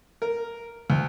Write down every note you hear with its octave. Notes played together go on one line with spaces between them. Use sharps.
A#4
D2